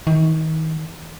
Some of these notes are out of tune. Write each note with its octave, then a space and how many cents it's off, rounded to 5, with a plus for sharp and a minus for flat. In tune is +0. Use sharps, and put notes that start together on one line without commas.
D#3 +35